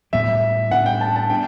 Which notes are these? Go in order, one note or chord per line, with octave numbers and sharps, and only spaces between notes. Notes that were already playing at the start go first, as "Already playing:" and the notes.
A2 G3 B3 D4 E5
A2 G3 B3 D4 F#5
G5
A5
A5
B3 D4 G5